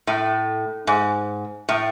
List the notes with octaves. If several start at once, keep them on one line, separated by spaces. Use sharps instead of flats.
A2
G#2
A2